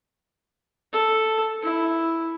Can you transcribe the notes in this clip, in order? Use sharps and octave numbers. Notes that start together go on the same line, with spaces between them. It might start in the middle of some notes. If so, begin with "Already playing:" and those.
A4
E4